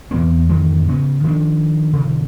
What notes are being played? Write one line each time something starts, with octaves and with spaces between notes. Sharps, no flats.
E2 E3 B3 C4
F2 D#3 E3 G#3
C#3 B3
D#3 F3 A3 D4
C3 D#3 F3